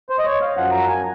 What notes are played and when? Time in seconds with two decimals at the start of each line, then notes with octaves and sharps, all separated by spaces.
0.10 C5
0.19 D#5
0.25 C#5
0.41 F5
0.56 F#2 F3 F#5
0.71 A#5
0.88 G#5